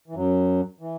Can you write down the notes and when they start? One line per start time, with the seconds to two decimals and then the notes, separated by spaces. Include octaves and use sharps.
0.08 E3
0.15 F#2 F#3
0.80 E3